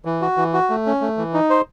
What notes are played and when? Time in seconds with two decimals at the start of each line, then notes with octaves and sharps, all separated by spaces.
0.05 E3
0.22 F#4
0.37 E3
0.54 F#4
0.70 A3
0.86 C#4
1.01 A3
1.18 E3
1.34 D#4
1.50 C5